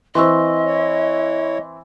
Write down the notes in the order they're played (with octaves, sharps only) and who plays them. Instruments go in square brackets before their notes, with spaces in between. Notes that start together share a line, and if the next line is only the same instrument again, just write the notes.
[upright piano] E3 C4 [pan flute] D#5 [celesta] C6 C#6 E6
[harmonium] E4 C#5